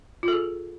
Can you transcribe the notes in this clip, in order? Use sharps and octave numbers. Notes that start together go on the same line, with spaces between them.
F4 G#4 A4